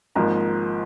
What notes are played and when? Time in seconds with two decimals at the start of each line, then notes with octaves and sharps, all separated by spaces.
0.15 G#1 G#2 F3 A#3 A#5